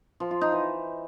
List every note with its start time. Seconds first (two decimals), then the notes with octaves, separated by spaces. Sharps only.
0.20 F3
0.31 F4
0.41 D#4
0.52 E3